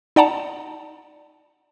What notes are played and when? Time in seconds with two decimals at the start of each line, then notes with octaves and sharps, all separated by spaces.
0.16 D#4 D5 F#5 A5 A#5